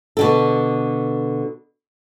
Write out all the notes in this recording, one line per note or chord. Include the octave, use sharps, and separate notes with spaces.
B2 D3 A4